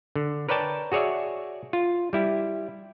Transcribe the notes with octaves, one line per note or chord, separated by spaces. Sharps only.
D3
A#4 B4 C#5 D5 G5 A5
F#4 G#4 C#5 D5 E5
F4
G3 E4 G4